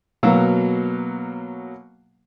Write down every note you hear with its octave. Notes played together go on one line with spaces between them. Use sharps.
B2 F#3 A#3 F5 A#5 E6